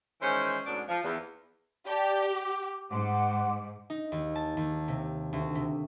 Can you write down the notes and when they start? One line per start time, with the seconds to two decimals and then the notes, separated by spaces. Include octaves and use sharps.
0.21 D#3 E3 G#3 C#4 C5
0.66 D2 G#2 B2 C#4 D4 D5
0.88 F3
1.03 E2
1.87 G4 D5 A5
2.44 D6
2.91 G#2 F#5 C6 D6
3.90 D#4
4.12 D#2
4.36 A5
4.57 D#2
4.88 C3
5.33 D2
5.55 C3